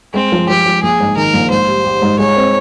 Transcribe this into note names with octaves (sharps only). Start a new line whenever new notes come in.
G#3 C4
F3
F3 G4
F3
A#1 G#4
G#2
D#3 A#4
A#1
G#2 C5
G3
G4
G#2
G#3 C#5
C4